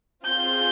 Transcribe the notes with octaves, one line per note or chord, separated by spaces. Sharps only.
C4 F4 G#4 G6